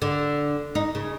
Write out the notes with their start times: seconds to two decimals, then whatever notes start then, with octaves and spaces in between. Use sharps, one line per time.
0.02 D3
0.75 D#4
0.95 C#3